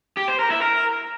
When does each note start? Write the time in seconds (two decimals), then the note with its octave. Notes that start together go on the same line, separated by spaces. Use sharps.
0.17 G4
0.28 C5
0.39 A#4
0.50 E4
0.62 A#4